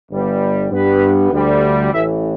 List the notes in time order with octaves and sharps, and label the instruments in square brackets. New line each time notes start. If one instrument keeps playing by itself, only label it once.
[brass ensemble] G1 G2 G3 B3
G2 G3 B3 B4
D2 D3 G3
A1 A2 E3 E5